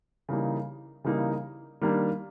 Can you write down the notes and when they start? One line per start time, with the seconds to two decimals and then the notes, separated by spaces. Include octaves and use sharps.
0.29 C#3 E3 G3 A#3 D#4
1.04 C#3 E3 G3 A#3 D#4
1.82 D#3 G3 A#3 D4